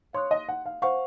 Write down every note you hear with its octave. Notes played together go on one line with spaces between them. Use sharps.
C#5 F5 C6 D#6 F#6
D#5
F#5
F5
C5 F5 F#5 C#6